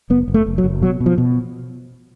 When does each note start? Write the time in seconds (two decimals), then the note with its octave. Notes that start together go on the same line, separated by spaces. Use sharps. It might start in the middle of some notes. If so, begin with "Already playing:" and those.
0.10 F#1 B3
0.28 F#1
0.34 A3
0.46 F#1
0.58 F#3
0.64 F#1
0.82 B2 F#3
1.00 B2
1.06 F3
1.18 B2